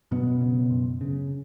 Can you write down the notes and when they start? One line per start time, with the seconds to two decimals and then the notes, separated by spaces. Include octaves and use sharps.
0.11 F#2 B2 B3
0.41 C#3
0.70 F#2
1.01 C#3